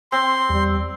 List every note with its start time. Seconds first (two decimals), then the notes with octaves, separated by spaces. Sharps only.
0.12 C4 C6
0.50 E2 G3